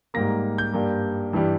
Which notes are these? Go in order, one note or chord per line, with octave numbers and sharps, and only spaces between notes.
G#2 G3 A#3 A#6
G6
G2 G3 A#3
G2 E3 G3